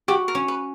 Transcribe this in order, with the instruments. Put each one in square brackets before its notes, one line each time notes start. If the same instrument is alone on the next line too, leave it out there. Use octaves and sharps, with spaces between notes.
[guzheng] F#4 [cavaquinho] G4
[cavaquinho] A#4
[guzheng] C#4
[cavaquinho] B4